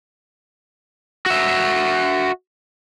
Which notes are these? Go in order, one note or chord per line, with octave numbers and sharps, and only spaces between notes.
F#4 E5